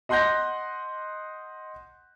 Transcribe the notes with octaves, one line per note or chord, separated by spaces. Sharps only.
D#5 F#5 C6 F#6 G6 A#6